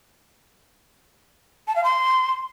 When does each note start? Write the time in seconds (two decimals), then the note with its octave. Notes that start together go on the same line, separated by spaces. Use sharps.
1.68 A5
1.76 F5
1.84 C6